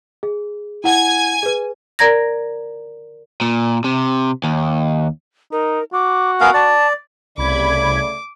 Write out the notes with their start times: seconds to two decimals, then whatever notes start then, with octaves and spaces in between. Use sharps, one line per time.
0.23 G#4
0.84 E4 F#5 G#5 G#6
1.43 G#4 B4
1.99 A#4 D5 A#5 G#6 A#6
3.41 A#2
3.84 C3
4.44 D#2
5.52 D#4 A#4
5.93 F#4 D6
6.41 B3 A#4 F5 G#5
6.54 D5 A5
7.38 C2 C#3 A3 D5 B5 D6 G#6